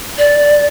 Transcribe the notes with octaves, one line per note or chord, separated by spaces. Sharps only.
D5